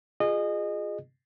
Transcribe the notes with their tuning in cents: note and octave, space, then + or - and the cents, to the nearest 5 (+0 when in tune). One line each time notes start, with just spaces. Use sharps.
F4 +20 G#4 +0 D#5 -25